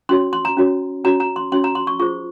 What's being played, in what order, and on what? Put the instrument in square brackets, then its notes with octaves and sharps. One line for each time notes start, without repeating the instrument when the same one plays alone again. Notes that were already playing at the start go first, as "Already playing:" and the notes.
[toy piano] C#4 F#4 C#5 C6
C6
A#5
C#4 F#4 C#5
C#4 F#4 C#5 A#5
A#5
C6
C#4 F#4 C#5 C6
A#5
C6
C#6
F4 G#4 C5 C#6